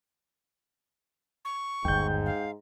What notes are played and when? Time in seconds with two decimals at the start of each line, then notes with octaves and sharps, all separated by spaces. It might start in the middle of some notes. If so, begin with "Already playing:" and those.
1.45 C#6
1.85 G1 D#2 G#2 G5 G6
2.26 F5